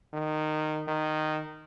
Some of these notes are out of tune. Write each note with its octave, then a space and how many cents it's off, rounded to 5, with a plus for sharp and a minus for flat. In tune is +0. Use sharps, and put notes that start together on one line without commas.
D#3 -15
D#3 -10